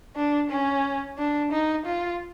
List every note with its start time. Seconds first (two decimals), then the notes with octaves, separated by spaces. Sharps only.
0.16 D4
0.50 C#4
1.18 D4
1.51 D#4
1.86 F4